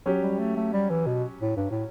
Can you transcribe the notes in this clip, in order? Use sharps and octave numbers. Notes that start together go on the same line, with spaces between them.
F#3 C#4 G4
G3
A3
A3
G3
E3
B2
A2
G2
A2